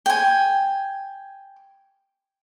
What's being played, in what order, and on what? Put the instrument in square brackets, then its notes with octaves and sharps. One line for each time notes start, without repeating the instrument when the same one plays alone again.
[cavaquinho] G5 G#5